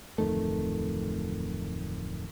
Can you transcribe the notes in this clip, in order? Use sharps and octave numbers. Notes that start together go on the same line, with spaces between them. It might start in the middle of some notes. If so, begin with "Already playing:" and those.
D1 F2 D#3 A3